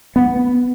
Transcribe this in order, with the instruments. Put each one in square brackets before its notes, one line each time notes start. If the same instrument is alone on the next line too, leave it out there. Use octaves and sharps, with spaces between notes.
[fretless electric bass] B3